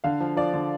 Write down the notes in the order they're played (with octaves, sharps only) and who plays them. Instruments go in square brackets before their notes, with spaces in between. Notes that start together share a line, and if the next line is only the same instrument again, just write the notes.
[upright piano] D3 F5
F3
F3 D5
D3